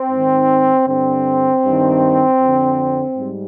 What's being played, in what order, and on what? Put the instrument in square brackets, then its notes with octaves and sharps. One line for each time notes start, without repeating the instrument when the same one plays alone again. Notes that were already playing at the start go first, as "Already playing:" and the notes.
Already playing: [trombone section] C4
G#2 D#3
G2 D3 C4
G2 D#3
F2 D3
G#2 G3